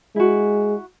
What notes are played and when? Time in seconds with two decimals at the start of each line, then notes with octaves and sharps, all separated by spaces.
0.16 G#3 E4 F#4